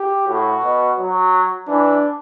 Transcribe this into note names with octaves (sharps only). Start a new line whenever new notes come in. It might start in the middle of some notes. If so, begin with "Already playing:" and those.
Already playing: G4
A2 F#4
B2
F#3
E3 D4